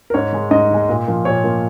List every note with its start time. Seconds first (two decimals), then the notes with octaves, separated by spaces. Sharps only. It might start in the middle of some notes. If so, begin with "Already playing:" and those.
0.10 A#4
0.14 G#2 C#5
0.33 D#3 G#3
0.51 G#2 D#5
0.71 D#3 G#3
0.89 A#2
1.08 F3 A#3
1.25 A#2 C#5
1.44 F3 A#3